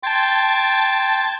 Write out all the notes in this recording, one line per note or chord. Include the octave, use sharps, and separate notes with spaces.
G5 A5 C6 G#6 A6